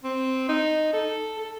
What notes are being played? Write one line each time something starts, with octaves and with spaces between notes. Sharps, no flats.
C4
D#4
A4
A4